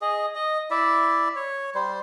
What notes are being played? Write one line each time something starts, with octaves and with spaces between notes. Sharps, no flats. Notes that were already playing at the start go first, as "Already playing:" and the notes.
G#4 D#5
D#5
E4 D5 E5
C#5
G3 C5